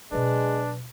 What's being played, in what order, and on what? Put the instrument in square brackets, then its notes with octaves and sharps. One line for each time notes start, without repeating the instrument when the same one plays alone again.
[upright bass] B2 F#3 [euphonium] G#3 [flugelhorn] D4 [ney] B4